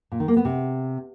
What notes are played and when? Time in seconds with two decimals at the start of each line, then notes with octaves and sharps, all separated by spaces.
0.12 A#2
0.20 D#3
0.28 A#3
0.37 B3
0.45 C3